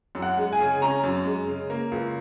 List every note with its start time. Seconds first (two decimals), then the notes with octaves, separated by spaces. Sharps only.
0.15 F#2
0.22 F#5
0.37 G#3
0.53 G#5
0.60 C#3
0.82 C#4 A#5
1.04 F#2
1.25 G#3
1.48 C#3
1.70 A#3
1.92 C#2